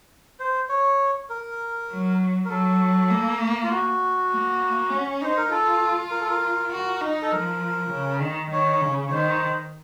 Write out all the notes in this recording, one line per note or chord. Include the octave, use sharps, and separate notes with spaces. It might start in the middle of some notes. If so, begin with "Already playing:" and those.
C5
C#5
A#4
F#3
A#4
F#3 A4
A#3
F4
F#4
A#3
C#4
D#4 C5
A#4
F4 A4
A#4
A4
A#4
F#4
D#4
A4
F3 A#4
C#3
D#3
D#3 C#5
C#3
C#5
D#3 C5